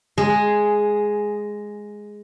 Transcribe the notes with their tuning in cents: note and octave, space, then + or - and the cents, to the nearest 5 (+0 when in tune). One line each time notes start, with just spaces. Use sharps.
G#3 +0 G#4 +0